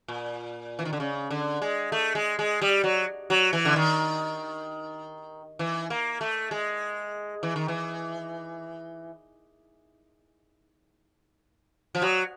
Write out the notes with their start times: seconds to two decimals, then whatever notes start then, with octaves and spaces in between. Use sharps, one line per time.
0.08 A#2
0.79 E3
0.85 D#3
0.93 D3
1.00 C#3
1.30 D3
1.62 G#3
1.92 A3
2.15 G#3
2.39 G#3
2.62 G3
2.84 F#3
3.30 F#3
3.53 E3
3.65 D3
3.76 D#3
5.59 E3
5.90 A#3
6.21 A3
6.51 G#3
7.43 E3
7.56 D#3
7.68 E3
11.95 F3
12.02 F#3